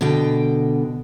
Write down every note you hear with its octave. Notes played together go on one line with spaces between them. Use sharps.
B2 D3 G5